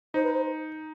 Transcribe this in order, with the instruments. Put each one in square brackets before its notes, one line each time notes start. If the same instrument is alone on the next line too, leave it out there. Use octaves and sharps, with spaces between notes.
[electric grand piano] D#4 [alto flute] C5
[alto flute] B4
C5